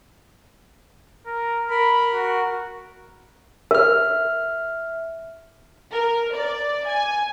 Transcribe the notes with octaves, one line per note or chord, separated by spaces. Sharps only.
A#4
A#4 B5
F#4
A#4 E5 F6
A#4
D5
G#5